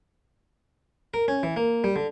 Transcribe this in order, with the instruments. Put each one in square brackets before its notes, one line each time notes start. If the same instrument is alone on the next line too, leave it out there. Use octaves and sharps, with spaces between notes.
[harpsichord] A#4
C#4
E3
A#3
G3
D3